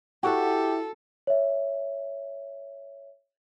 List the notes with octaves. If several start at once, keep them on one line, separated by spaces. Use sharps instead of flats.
E4 F#4 G4 A4 E5 F#5
C#5 E5